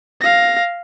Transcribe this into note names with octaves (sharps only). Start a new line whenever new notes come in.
F5 A#6